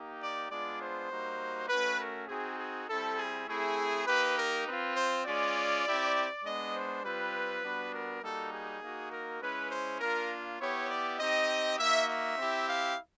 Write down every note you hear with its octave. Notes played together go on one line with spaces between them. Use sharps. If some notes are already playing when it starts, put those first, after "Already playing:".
Already playing: A#3 D#4 G4
D5
G#3 B3 D4 F4 D5
C5
G3 A#3 D#4 F#4
A3 C#4 F#4 B4
A#4
C4 D#4 F#4 G#4
G#4
G3 C4 E4 A4
G#4
A3 C4 E4 G#4
A#3 D#4 G4 B4
A#4
C4 F4 B4
C5
G#3 C#4 F4 D5
C4 E4 G4
G#3 B3 D4 D#5
C5
G3 C4 F4 B4
G3 B3 D4 F#4
A#4
G3 A#3 D#4 F#4 A4
G#4
A#3 D#4 F#4
A#4
G#3 C#4 E4 B4
C5
A#3 D4 F4 A#4
B3 E4 G4 C#5
D5
C4 D#4 G4 D#5
A#3 D#4 F#4 E5
E5
C4 E4 G4
F5